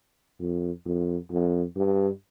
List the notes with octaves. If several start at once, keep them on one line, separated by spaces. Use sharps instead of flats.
F2
F2
F2
G2